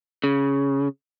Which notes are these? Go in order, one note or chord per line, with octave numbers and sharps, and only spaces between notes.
C#3